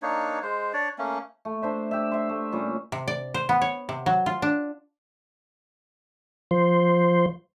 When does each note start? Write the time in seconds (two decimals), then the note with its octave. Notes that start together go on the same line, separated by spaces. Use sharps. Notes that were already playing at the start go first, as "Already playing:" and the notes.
0.02 A#3 D4 D#4 C#5
0.43 G#3 C5
0.73 D4 C#5 D5
0.98 A3 A#3 C#4
1.45 A3
1.62 D4 C5 E5
1.91 G4 E5
2.12 E5 C6
2.29 A3
2.52 A#2 G3 C#4
2.92 C3
3.08 D5
3.34 C5
3.49 B3
3.62 C#5
3.89 C3
4.06 F#3
4.26 F4
4.42 D4
6.51 F3 C5